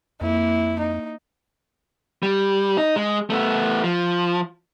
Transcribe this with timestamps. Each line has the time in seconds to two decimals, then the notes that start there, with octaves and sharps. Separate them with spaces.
0.21 F2 A#3 E4
0.79 D#4
2.23 G3
2.78 D#4
2.96 G#3
3.30 A3 B3
3.84 F3